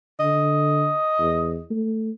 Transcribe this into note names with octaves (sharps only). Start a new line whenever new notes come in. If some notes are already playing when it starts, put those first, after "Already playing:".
D3 D#5
E2
A3